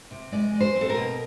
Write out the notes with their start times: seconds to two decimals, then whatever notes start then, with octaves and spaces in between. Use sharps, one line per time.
0.11 C3
0.32 G#3 D5
0.54 G#3
0.60 C5
0.75 C4
0.81 A4
0.90 A#4
0.97 B2